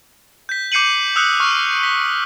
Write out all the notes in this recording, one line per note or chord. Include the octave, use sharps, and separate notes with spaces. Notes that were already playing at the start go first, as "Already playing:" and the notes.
G6 B6
D6 G6 C7 C#7 D#7 F#7
D#6 E6 F#6 C#7
C#6 F6
B6